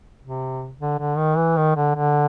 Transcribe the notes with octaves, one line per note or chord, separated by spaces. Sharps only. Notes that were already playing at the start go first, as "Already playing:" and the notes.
C3
D3
D3
D#3
E3
D#3
D3
D3